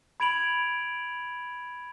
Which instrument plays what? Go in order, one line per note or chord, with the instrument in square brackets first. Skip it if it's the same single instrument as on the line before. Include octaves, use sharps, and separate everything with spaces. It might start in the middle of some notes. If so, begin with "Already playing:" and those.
[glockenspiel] B5 G#6 D7 F7 F#7